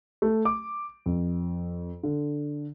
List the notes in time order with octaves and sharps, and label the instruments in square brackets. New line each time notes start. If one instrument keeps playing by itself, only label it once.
[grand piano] A3
D6
F2
D3